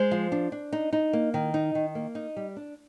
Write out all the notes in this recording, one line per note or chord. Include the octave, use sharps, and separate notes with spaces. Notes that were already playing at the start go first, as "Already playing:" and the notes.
Already playing: G#3 C5
F3
D4
D4
D#4
D#4
A#3
D#3
D#4
D#3
A#3
D#4
G3
D4